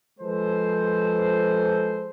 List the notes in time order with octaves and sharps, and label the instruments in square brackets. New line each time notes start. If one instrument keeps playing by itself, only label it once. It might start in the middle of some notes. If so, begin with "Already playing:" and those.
[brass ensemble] F3 G#3 A4 B4 C5